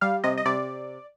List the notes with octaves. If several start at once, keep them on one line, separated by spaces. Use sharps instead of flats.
G3 F5
C3 D#5
D#5
C3 D5